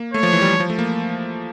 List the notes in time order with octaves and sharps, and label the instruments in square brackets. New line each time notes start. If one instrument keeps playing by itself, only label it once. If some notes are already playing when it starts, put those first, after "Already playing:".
Already playing: [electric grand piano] A#3
[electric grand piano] A3 [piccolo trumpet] C#5
[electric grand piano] F3
E3
G3
F3
A3
A#3